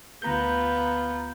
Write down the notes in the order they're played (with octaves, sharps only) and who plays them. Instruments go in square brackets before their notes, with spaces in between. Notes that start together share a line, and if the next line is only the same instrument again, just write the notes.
[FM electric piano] D2 A#5 G6 [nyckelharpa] B3 F4